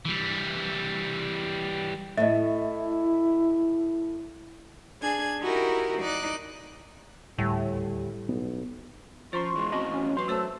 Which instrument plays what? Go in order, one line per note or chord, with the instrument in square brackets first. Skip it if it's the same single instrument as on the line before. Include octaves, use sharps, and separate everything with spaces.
[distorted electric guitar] E3 G3
[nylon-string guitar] A2 A3 [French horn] E4 [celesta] D#5 E5
[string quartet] D4 G#4 G#6
D#4 E4 F#4 G4 A#4
D#4 D5 F#6
[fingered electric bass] D#1 D2 [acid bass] A2 [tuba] G3
[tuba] B1 [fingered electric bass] B3
[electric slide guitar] F3 [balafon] C#4 F4 C5 [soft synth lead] C6 [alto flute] C#6
[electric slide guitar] E2 E3 G#3
[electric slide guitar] E2 A2 D#5 [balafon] C4 C#4 F#4
[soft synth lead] C#4 [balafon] F#4
[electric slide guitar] F#3 [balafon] B4 C#6 [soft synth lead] C6
[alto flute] A3 [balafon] F#4 C5 E5 [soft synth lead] E6